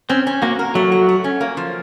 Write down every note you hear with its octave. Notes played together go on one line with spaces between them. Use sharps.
C4 C#4
C#4
A#3 F#4
A#4
F#3 A3
F#4
A3
C#4
A#3
F3